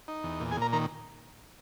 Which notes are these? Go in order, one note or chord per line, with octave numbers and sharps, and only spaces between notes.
D#4
E2
A#2
G#4 G#5
A#2 A#4 A#5
D#3 A#4 A#5